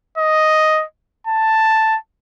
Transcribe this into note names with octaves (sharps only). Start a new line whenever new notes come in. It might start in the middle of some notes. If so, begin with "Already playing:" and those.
D#5
A5